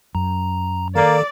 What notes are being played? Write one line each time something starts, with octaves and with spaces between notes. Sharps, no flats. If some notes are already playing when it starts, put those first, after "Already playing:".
F#2 A#5
D#3 A#3 A4 D5